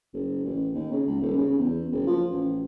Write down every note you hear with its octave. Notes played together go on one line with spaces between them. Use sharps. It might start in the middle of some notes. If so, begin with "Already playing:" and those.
F#1
A1
D#2
C#3
C#2
D#1
C#3
E2
F#1
F3
A1